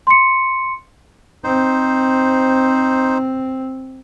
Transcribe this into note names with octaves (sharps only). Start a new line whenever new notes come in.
C6 C#7
C4 D#4 C5